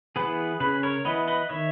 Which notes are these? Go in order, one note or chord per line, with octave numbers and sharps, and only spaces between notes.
E3 B3 G#4 B4
C#3 G#4 B4
A#4 C#5
E3 B3 B4 D#5
B4 D#5
D#3 C#5 E5